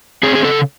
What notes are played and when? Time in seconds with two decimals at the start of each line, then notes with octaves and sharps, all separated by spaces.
0.23 C4 G#4
0.35 G#4
0.44 C#3 A4